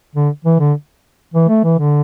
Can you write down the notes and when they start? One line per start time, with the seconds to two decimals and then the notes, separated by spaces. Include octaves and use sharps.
0.15 D3
0.45 E3
0.59 D3
1.34 E3
1.49 A3
1.64 E3
1.78 D3